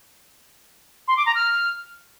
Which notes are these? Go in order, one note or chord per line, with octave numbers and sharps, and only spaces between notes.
C6
D6
A#5
F6